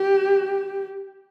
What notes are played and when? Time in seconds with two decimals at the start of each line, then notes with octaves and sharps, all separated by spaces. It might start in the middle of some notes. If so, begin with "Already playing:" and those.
Already playing: G4